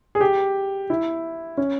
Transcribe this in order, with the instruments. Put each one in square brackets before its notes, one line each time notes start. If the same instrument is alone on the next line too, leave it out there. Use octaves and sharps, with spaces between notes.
[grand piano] G#4
G4
E4
C#4